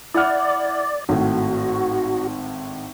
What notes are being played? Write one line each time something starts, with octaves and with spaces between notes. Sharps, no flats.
E4 D5 F#5 F6
G#1 A2 F#4